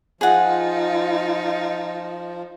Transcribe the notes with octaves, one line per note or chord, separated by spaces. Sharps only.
F3 D#4 F4 G#4 F#5